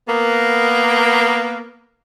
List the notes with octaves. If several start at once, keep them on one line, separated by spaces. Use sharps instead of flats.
A#3 B3